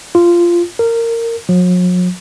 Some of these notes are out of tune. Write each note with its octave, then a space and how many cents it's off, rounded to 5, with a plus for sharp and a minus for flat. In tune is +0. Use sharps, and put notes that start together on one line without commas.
F4 -15
A#4 -20
F#3 -45